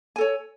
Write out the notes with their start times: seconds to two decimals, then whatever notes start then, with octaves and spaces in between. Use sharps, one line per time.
0.16 G#5
0.18 A4
0.21 C#5